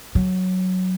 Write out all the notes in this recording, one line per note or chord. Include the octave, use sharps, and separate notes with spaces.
F#3